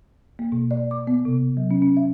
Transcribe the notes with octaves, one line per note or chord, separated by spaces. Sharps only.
A#3
B2
D5
D6
B3
C3
F#3
C#4
C#4
E5